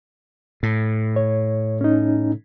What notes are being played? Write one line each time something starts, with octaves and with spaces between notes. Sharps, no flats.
A2
C#5
C#4 D#4